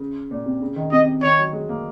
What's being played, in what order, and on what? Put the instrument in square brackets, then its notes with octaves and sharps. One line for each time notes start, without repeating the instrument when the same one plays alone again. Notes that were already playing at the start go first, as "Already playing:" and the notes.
Already playing: [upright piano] C#3
A#2
C3
C#3
D#3
[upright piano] C3 [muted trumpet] D#5
[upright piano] D#3 [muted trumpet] C#5
[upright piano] F#3
G#3
A#3